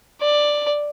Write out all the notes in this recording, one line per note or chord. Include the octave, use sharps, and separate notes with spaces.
D5